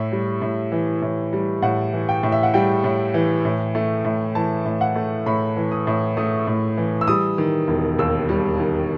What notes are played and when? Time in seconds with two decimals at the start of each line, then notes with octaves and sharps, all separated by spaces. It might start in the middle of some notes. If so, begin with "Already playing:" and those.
Already playing: A2 E5
0.12 G3
0.42 A2
0.72 E3
1.02 A2
1.33 G3
1.62 A2 F#5
1.93 E3
2.09 G5
2.23 A2
2.32 E5
2.43 F#5
2.54 G3 G5
2.84 A2
3.14 E3
3.45 A2
3.75 A3
4.05 A2
4.35 E3 A5
4.66 A2
4.81 F#5
4.96 A3
5.26 A2 B5
5.57 E3
5.71 D#6
5.87 A2
6.17 A3 D#6
6.47 A2
6.77 E3
7.01 E6
7.07 G3 D#6
7.38 D#3
7.68 E1
7.99 D#2 E6
8.29 G3
8.59 D#3